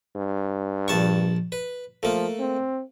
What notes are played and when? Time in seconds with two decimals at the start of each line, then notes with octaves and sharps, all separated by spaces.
0.16 G2
0.88 A#1 A5 C#6
1.52 B4
2.03 F3 A3 A#3
2.40 C4